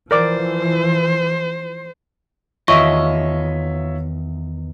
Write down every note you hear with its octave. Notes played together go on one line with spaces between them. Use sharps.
E3 F3 A#4 C5 D5 D6
E2 D#3 F4 C#5 D#5 E5 C#6